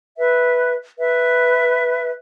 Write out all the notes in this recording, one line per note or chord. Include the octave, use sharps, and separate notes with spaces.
B4 E5
B4 E5